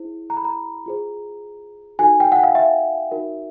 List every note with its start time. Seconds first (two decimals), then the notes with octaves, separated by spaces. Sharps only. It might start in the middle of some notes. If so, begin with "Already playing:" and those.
Already playing: E4 G#4 C5
0.30 A#5
0.37 B5
0.45 A#5
0.86 F4 G#4 C5
1.99 D#4 F#4 A4 G#5
2.20 G5
2.32 F#5
2.43 F5
2.55 E5
3.11 D#4 F#4 A#4